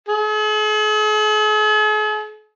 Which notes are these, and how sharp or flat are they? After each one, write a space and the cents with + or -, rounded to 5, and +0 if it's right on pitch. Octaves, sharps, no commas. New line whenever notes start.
G#4 +45